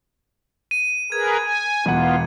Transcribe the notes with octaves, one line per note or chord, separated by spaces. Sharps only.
D#7
G#4 A#4 B4 G#6
G#5
E1 B3 F4 F#5